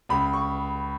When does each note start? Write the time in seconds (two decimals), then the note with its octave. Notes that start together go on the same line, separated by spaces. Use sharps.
0.09 C#2 B5
0.33 C#6